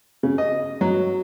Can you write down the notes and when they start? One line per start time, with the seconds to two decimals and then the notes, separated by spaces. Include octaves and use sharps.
0.23 C#3
0.38 D#5
0.81 F#3